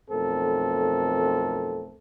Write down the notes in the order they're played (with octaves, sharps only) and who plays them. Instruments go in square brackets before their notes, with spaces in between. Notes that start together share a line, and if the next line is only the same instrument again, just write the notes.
[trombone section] B1 F2 A3 C4 A4 A#4